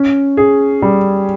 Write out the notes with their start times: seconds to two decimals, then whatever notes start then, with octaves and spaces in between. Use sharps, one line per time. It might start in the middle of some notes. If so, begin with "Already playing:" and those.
Already playing: C#4
0.37 G#4
0.82 G3